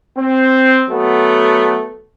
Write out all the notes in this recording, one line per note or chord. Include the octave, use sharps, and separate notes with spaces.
C4
F#3 A3 B3